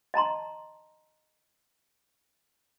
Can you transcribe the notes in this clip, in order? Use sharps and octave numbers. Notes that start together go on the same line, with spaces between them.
D#5 A5 A#5 C6